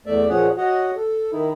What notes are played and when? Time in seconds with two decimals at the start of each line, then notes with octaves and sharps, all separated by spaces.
0.06 E2 A3 D5 E5
0.29 A#2 F3 C#4 G#4 C#5 F#5
0.57 F#4 C#5 D#5 F#5
0.97 A4
1.32 D#3 D#4 E4